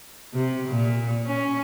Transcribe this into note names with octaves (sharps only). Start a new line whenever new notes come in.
C3
A#2
C#4